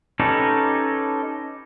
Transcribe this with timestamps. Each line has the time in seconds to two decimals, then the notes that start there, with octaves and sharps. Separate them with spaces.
0.20 C#4 D#4 G4 A4 B4